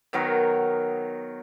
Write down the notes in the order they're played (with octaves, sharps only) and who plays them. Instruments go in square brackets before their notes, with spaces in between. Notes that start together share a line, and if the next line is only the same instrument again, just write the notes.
[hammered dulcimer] D#3 F#3 B3 A#4